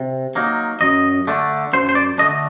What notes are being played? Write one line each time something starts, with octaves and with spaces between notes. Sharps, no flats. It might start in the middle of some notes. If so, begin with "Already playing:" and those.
Already playing: C3
F#3 A#3 D#4
F#2 D#5
D3 A3 D4
F#2 C5
C5
D5
D3 A3 D4 D#5